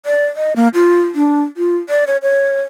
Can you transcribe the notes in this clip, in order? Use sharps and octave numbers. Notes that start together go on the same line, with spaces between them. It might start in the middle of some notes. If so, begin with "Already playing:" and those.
D5
D#5
A#3
F4
D4
F4
D5
C#5
C#5